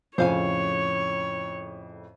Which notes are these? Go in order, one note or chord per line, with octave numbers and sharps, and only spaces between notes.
F2 A2 C#3 C5 C#5 F5 G#5